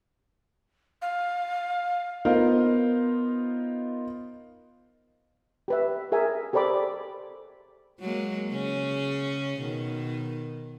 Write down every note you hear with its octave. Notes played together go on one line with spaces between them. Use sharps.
F5
B3 D#4 F4 A#4 C5 F5
G4 B4 E5
G#4 A#4 E5 G#5
G4 A4 C5 D5 B5 D6
F#3 G#3 A#3
C#3 C#4 G#4
B2 D#3